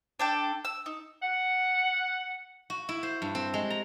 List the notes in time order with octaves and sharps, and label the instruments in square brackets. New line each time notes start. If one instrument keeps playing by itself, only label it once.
[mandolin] D4 A4 G5
E6
D#4
[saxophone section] F#5
[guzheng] F#4
E4
C5
G2
C4
G#3
A#5